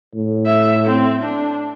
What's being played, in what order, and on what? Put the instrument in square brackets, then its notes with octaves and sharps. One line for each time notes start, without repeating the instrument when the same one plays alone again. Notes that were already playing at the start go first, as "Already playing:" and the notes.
[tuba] A2
[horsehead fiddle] E5
C4
D4